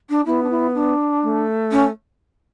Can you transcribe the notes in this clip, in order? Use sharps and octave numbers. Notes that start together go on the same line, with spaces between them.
D4
B3 E4
D4
E4
D4
A3
C#4